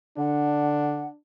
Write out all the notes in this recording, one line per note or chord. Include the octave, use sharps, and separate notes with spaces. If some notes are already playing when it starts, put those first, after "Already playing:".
D3 D4 F#5